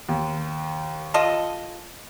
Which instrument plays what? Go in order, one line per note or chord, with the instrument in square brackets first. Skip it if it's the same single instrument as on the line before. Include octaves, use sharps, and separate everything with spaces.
[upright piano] D#2
[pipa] F4 A4 D#5